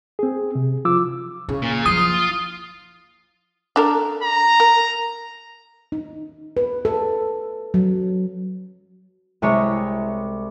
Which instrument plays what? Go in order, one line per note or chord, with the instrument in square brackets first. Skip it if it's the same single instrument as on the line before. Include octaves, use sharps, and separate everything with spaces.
[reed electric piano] C4 G#4
C3
F3 F4 D6 E6
[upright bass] C#3
[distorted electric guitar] A#2
[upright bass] E3 F3 [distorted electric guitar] F4 [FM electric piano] D#6
[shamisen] D4 A4 A#4
[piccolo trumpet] A#5
[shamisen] A#4
[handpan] D#4
B4
A4
F#3
[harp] C2 C3 G#3 C#5